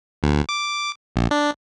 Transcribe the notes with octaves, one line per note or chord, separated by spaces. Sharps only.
D2
D6
A#1
D4